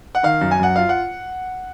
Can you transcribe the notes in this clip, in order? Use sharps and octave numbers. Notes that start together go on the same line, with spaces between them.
F#5
D#3 F5
F#2
G#5
F#2 F#5
F4 F5
F#5